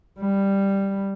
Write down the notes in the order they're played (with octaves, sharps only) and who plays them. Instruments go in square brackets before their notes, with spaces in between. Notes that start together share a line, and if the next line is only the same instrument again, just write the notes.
[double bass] G3